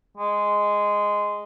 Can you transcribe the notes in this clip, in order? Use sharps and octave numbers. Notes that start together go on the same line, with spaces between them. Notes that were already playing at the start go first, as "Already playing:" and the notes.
G#3